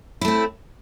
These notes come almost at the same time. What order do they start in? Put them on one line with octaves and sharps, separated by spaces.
E4 A3 C4